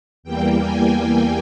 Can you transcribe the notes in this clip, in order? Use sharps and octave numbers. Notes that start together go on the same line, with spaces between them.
E2 E3 G3 A#3 G5
G#5
G5